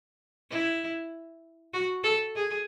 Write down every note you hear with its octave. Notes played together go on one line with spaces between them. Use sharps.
E4
F#4
A4
G#4